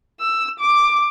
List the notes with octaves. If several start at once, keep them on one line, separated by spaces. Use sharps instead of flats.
E6
D6